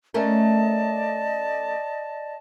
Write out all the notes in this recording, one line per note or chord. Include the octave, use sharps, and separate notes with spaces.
A3 C#4 A#4 D5 D#5 A5